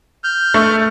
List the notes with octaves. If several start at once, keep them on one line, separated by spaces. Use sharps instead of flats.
F6 G6
A3